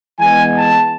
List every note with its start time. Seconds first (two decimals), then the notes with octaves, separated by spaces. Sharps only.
0.20 E3 G#3 B3 G#5
0.57 A5